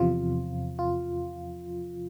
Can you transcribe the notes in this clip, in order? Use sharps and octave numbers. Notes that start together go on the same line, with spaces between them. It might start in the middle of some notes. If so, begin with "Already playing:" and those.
Already playing: E2 C3 F3 F4
F4